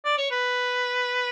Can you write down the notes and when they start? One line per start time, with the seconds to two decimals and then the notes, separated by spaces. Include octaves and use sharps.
0.05 D5
0.18 C#5
0.31 B4